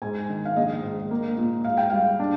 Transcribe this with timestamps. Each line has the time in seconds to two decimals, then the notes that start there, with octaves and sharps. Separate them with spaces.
0.02 G#2 G#5
0.29 D#3
0.45 F5
0.56 A#1 D#5
0.83 G#2
1.11 A#3
1.37 A#2
1.64 G#2 F5
1.77 G5
1.90 G3 F5
2.20 D4